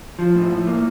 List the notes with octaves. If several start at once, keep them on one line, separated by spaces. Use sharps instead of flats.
F3
A2
A2
A#3